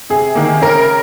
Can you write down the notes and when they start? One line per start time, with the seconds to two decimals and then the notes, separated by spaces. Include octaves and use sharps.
0.10 C3 G#4
0.35 D#3 A#3
0.62 C#3 A#4